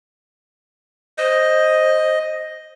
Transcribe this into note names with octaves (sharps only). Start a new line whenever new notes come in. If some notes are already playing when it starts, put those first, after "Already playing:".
C5 D#5